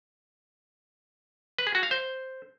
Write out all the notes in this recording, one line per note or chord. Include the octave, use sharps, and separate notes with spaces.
B4
G#4
F#4
F5
C5